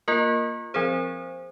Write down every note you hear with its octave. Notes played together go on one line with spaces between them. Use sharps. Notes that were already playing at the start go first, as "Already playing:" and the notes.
A#3 F4 A#4
F3 C4 G#4 C5